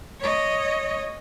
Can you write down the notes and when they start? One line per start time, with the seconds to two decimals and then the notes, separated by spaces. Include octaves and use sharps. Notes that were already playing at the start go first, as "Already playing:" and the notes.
0.21 C#5 D#5